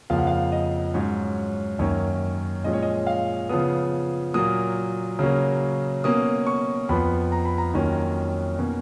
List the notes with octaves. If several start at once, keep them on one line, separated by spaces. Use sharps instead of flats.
F2 C#3 F3 A#3 F5
F#5
F5
D#5
G#2 F#3 C#4 C#5
F#2 D#3 A#3 C#4 C#5
A#2 F3 G#3 C#4 D#5
C#5
D#5
F5
C#3 F3 B3 D#6
A#2 F#3 A#3 D#6
C#3 F#3 A#3 C#4
B2 A#3 C#4 D#6
C#6
F2 F3 B3 B5
A#5
B5
A#5
F2 D#3 F#3 A#3 C#4
B2 A#3 C#4